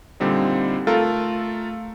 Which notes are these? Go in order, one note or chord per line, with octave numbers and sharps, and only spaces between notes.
A#2 D3 G3 C4 D#4
A3 F4 A4 A#4